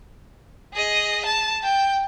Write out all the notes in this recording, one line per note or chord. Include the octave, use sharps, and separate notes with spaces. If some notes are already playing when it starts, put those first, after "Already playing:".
G#4 D#5
A5
G5